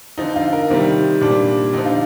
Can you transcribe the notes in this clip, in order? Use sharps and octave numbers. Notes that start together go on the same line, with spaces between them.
D3 F3 D#4
F4
A#4
C3 D#3 G3 C4
A#2 G3 D4
D3 F3 D#4
F4